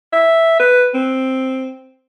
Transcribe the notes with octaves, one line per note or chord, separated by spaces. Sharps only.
E5
B4
C4